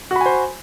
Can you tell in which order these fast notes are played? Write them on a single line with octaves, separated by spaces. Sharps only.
F#4 B5 G#5 C5